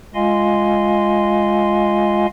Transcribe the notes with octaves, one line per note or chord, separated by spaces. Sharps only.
G#3 F4 D#5 F5 G#5 C6